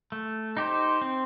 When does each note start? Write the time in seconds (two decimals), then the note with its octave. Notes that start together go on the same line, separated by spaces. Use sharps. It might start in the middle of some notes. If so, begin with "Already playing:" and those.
0.12 A3
0.57 D#4 G4 C5
1.02 C4